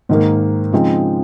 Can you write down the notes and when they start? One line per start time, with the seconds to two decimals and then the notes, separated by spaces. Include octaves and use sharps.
0.09 G#2 D#3 A#3
0.72 C#3 F3 G#3 C4 D#4